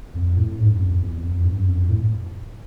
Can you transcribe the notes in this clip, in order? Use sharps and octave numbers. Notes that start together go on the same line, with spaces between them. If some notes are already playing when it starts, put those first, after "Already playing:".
F2
A2
G#2
F#2
F2
E2
F2
G2
F#2
F2
A2